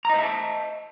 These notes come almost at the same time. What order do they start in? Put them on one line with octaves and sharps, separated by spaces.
A#5 D#5 C5 E5 A5